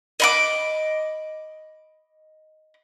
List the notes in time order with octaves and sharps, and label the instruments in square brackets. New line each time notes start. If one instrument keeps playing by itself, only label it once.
[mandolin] D#5 B5 D6